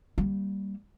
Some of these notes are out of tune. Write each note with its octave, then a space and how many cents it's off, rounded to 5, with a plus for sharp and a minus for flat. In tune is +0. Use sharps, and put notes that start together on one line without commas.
G3 +0 A#3 +0